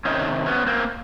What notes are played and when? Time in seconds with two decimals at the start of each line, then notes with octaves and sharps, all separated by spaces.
0.05 C3 D#3 C#4 D#4
0.46 B3 C#4
0.66 A#3 C4